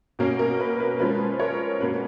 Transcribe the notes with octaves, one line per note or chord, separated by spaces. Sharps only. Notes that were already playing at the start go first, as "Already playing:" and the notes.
B2 A#3 C#4 A#4
A#4
B4
B4
F3 G#3 C#4 B4
A#4 C#5
B2 A#3 C#4 B4